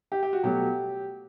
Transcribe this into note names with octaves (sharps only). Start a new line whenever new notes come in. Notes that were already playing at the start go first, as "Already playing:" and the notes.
G4
G4
F#4
B2 F#3 A3 G4